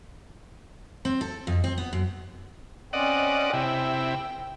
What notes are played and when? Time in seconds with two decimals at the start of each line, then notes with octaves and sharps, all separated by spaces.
1.05 C4
1.21 A4
1.47 F2
1.64 C4
1.78 B3
1.93 F#2
2.93 C4 C#4 D5 D#5 F#5
3.53 C3 E4 G5